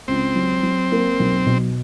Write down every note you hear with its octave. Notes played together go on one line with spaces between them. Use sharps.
C#2 C4
F#3
F#3
A#3
B1
B2